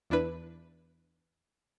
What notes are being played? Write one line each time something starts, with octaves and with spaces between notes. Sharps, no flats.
E2 D4 E4 B4